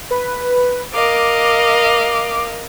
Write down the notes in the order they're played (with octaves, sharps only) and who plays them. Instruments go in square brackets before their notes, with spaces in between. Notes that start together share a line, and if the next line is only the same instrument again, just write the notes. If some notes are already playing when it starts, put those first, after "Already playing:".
[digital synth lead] B4
[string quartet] A#4 D#5 F5 [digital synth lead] D6